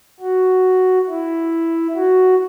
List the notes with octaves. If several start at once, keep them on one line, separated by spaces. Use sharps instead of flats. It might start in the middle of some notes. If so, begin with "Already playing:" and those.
F#4
E4
F#4